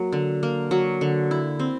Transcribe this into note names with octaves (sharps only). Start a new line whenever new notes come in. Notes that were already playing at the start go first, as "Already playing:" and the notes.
Already playing: F#3 A#3
D3
A#3
F#3
D3
E4
C4